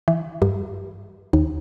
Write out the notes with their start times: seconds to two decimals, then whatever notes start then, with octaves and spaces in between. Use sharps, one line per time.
0.08 E3
0.42 G2
1.33 D#2